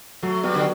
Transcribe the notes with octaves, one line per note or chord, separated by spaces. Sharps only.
F#3 A3
G3 B3 F#4
D3